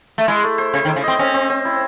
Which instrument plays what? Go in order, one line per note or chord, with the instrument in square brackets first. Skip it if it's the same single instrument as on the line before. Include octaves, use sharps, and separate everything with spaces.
[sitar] A3
[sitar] G#3 [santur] E4
[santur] A3
C5
[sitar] C#3 [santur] C5
[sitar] D#3
[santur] E4
[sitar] C#3
[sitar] C4 [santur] D#5
[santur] C4 [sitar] C#4
[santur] C4
C4
E4